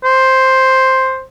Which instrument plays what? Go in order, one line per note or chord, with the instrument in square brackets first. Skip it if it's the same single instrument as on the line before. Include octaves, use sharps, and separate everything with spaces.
[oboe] C5